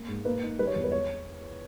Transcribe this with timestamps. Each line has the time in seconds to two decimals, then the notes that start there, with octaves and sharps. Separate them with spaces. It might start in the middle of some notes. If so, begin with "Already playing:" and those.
Already playing: A#3
0.08 G#2
0.25 A#3 B4
0.43 D#4
0.59 G3 B4
0.67 C#5
0.76 E2
0.84 B4
0.92 G#3 C#5